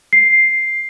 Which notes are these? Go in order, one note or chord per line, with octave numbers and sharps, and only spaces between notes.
C7